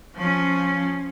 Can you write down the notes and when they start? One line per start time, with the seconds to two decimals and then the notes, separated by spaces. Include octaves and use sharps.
0.15 F3 C#4